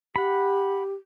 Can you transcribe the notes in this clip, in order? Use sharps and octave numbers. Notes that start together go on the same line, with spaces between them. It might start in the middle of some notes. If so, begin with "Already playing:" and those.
G4 F#5 B5